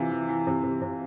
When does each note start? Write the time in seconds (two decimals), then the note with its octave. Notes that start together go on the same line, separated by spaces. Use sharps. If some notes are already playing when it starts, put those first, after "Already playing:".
Already playing: C3 E3 F4
0.11 E3
0.29 E3
0.47 C3
0.64 C3
0.82 C3